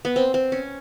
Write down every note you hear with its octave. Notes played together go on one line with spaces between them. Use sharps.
B3
C4
C4
C#4